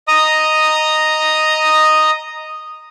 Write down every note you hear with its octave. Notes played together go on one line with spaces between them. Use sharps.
D#5 A#5 D#6